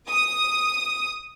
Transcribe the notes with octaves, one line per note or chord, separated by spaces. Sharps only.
D#6